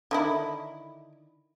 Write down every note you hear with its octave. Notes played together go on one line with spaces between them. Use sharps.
D3 D#3 E4